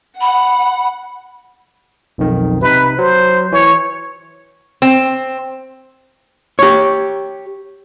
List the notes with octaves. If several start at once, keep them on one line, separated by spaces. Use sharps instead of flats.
F#5 B5
B1 F2 D#3
C3 D#4 B4
F#3 C5
E3 C#5
C4
G4 C#5